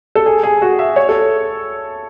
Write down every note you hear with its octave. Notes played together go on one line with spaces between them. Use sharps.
A4
G#4
G#4
F#4
E5
C#5
A4